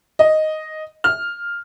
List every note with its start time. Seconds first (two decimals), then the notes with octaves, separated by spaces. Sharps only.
0.19 D#5
1.04 F6